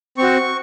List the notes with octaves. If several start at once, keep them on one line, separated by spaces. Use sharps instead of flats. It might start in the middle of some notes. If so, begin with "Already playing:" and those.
C4 F#4 C#6